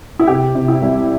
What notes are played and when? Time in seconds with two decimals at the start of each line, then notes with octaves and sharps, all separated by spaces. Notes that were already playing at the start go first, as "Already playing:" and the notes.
0.19 E4
0.27 C3 G4
0.55 C3
0.68 E4
0.82 C2